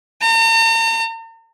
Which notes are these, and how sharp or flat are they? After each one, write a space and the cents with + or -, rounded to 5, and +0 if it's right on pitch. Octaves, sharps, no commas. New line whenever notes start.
A#5 -45